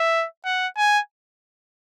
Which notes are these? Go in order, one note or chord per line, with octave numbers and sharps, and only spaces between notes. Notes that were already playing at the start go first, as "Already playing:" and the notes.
Already playing: E5
F#5
G#5